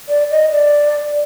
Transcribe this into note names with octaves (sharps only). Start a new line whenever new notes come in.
D5
D#5
D5